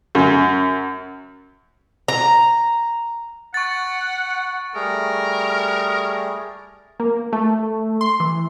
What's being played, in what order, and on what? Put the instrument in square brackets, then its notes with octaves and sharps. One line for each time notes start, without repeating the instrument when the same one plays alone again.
[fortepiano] F#2
[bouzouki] A#5
[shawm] F#5 [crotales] C#6 A6
[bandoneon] G3 A3 G#4 [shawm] A#4
[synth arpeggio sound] A#3
A3
C6
E3